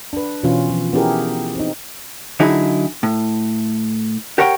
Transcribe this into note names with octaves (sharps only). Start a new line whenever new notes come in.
D4 B4
B2 E3 C#4 F4
F3
B3 C#4 E4 G4 G#4 A#4
C4 D#4
D3 F#3 D#4 E4 G#4
A2
G4 A#4 C#5 F#5 G5